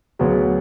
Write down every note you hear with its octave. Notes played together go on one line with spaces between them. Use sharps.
D2 C#3 F#3 B3